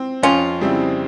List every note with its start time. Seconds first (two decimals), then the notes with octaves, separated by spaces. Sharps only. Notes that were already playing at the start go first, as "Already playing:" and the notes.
Already playing: C4
0.23 F2 C#4 F4
0.61 C#3 G3 C4 E4